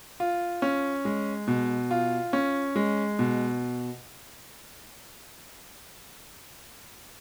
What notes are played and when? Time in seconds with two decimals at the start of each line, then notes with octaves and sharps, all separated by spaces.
0.20 F4
0.62 C#4
1.05 G#3
1.48 B2
1.91 F4
2.33 C#4
2.76 G#3
3.19 B2